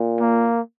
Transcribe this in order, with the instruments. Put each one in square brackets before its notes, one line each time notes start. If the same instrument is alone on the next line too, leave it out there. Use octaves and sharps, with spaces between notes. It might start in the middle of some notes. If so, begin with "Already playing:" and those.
Already playing: [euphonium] A#2
[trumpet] A#3